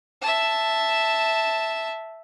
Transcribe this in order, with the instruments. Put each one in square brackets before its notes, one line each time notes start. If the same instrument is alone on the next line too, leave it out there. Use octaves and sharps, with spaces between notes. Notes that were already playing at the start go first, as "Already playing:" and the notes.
[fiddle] E5 A5